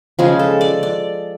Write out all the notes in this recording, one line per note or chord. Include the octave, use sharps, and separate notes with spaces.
C#3 F3 G#3 G#4
A4
D5
D5